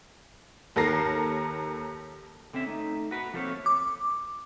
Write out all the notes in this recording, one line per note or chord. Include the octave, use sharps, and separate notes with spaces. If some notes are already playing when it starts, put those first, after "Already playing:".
D#2 A4 A#4 A#6 C7
D3 C4 C#4 E5
A3 D#4
F#4 B4
F3 A3 A#3 C4 C5 C#5
D6